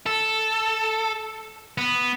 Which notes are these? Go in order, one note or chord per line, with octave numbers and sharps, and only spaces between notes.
A4
B3